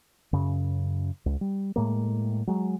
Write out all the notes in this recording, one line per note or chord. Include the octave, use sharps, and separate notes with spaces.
F#2 C#3
C#2
G3
A2 G#3 A#3
F#3 G#3